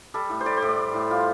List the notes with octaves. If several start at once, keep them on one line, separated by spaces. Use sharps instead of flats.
G3 A4
A2
C5
G3 D5
C5
A2
D5
G3
A2
G3 F4